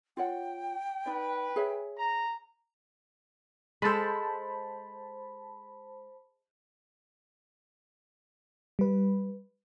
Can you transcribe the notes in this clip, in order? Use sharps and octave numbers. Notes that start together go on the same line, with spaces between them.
F4 C#5 F#5 G5
D#4 B4 D5
G#4 C#5 E5
A#5
G#3 A4 C5 A5 B5
G3 B4